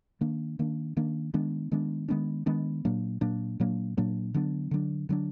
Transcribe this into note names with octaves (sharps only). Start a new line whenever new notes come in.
D#3 A#3 D4
D#3 A#3 D4
D#3 A#3 D4
D#3 G#3 B3 D4
D#3 G#3 B3 D4
D#3 G#3 B3 D4
D#3 G#3 B3 D4
A#2 F#3 A#3 D4
A#2 F#3 A#3 D4
A#2 F#3 A#3 D4
A#2 F#3 A#3 D4
D3 F#3 B3 D4
D3 F#3 B3 D4
D3 F#3 B3 D4